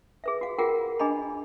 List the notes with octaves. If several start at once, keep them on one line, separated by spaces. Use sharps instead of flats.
G#4 B4 E5
F#4 F5
F4 F#4 G#4 A#4 F#5 G5
D4 G#4 D#5 A#5 B5